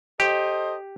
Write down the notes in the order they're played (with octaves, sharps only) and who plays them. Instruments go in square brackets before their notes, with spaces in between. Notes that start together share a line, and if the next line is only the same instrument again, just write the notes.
[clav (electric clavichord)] G4 [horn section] A4 C5 D#5